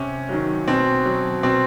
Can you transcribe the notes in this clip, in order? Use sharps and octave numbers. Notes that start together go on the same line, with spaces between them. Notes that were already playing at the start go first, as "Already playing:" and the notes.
Already playing: C3 C#4
D#3 F#3
B2 C4
F#3
B2 C4